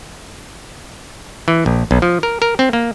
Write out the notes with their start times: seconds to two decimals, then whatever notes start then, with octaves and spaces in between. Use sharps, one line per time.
1.48 E3
1.66 A#1
1.91 B1
2.02 F3
2.23 A#4
2.42 A#4
2.59 C4
2.73 A#3